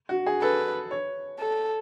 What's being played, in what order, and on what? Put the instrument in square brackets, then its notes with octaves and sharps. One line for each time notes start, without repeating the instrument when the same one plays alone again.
[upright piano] F#4
G#4
[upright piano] A4 [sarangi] B4
[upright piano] C#5
[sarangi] A4